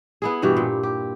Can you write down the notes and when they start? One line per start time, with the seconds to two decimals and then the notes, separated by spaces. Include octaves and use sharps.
0.22 B3 E4 G#4
0.42 G2 B2 E3 G4
0.57 A#2
0.83 G4